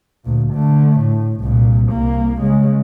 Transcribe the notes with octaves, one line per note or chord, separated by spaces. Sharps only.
D2 A#2
D3 A3
A2
C2 A#2
C2 A#3
C#3 G#3